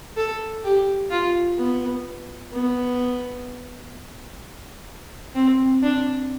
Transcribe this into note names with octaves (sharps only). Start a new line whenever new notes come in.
A4
G4
F4
B3
B3
C4
D4